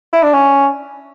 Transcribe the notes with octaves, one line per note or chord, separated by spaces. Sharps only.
E4
D4
C#4